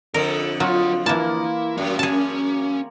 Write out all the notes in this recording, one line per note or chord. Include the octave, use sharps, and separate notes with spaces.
F2 D3 A4 A#4
F#3 F4 A#4 F#5
E3 A#3 E4 A5
F#2 G3 F#4
C#4 G#4 A5